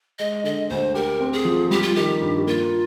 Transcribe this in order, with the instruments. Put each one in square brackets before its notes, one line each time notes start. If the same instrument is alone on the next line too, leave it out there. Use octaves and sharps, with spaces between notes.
[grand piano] G#3 [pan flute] D#5
[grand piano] D3 [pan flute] D#5
[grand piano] D2 [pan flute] C5
[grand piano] G4 [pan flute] A#4
[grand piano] C4
[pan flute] G#4
[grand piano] F3
[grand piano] G3 [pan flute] G4
[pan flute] F4
[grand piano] D#3 [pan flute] G4
[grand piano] G2
[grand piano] A#3 [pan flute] F4